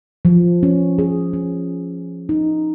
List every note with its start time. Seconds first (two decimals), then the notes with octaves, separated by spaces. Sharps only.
0.25 F3
0.63 C#4
0.98 G#4
1.33 C#4
2.29 D#4